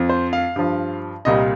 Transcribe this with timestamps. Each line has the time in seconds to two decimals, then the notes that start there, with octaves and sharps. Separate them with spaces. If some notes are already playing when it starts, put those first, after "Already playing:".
Already playing: F2 F3
0.09 C5
0.33 F5
0.56 G2 F3
1.25 C2 A#2 G3 D#5